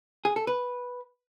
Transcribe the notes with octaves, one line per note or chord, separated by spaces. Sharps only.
G#4
A4
B4